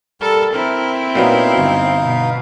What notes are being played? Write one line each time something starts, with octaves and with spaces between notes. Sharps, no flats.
G3 A4 A#4
C4 E4 A#4
A#2 F#3 B3 D#4 F5
G1
B2